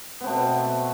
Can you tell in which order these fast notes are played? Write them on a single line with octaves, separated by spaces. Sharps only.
B3 C4 A3 B2